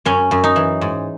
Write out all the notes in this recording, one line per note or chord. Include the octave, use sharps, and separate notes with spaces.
F#2 C#4
F#2
D#4
E3
G#2